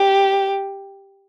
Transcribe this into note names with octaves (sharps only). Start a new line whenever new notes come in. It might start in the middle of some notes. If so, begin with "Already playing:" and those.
Already playing: G4